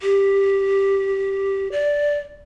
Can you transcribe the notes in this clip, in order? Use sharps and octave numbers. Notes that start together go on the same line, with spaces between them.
G4
D5